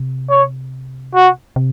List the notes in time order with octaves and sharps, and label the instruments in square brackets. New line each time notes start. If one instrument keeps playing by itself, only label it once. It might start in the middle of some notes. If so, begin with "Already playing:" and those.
Already playing: [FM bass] C3
[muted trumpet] C#5
F#4
[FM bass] C3